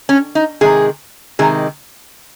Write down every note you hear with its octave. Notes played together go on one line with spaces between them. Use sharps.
C#4
D#4
C3 D#3 G#3 G#4
C3 D#3 G#3 G#4